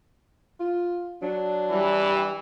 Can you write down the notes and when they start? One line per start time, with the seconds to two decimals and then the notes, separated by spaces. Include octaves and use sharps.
0.60 F4
1.22 F#3 D4
1.69 E3 G3